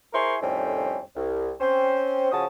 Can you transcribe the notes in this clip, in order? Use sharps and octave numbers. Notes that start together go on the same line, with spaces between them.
E4 G#4 A#4 C5 C6 C#6
F2 A2 D#3 G3 C4 C#4
C2
C4 C#4 C5
C#3 F3 C#4 F#4 A5 D#6